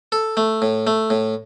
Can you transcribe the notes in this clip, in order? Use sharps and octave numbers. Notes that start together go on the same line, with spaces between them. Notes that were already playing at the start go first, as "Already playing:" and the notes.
A4
A3
A2
A3
A2